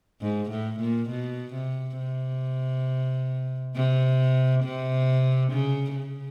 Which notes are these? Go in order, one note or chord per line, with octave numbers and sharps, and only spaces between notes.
G#2
A2
A#2
B2
C3
C3
C3
C3
C#3
C#3